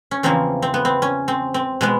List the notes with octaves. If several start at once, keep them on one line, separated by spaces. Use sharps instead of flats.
C#4
E2 C#3 F3 A#3 C4
C4
B3
C4
C#4
C4
C4
B2 G#3 B3